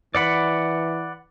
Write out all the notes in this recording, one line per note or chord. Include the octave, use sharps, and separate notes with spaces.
E3 D5 F#5 B5